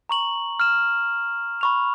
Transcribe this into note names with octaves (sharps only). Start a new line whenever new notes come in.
A#5 C#6 F#7
F6 E7
B5 C#6 F7